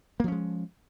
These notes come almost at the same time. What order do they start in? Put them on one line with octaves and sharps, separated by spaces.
A#3 F3 C#4 G#3